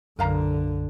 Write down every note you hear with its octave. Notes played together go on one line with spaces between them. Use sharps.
B1 F#2 D3 A#4 F5 A#5